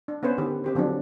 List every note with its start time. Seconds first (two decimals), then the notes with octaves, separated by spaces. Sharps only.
0.08 D4
0.23 B3 C#4 B4 C5
0.38 D3 D#3 G4
0.64 C4 G4 C5
0.75 D3 F3 F#3 C4 D4